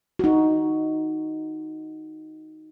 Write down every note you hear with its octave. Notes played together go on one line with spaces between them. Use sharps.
D#4 F#4